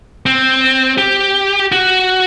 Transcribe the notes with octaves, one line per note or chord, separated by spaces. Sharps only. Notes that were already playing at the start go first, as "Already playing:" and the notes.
C4
G4
F#4